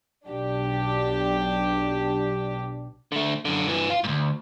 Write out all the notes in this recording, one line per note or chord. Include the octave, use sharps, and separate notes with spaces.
B1 D4 G4
D3 A3
F#2 D3
G2 E3
F4
D2 G#2